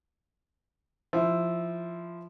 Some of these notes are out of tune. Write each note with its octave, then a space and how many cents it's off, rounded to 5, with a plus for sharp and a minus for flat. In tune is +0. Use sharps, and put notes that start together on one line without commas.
F3 -10 E4 +0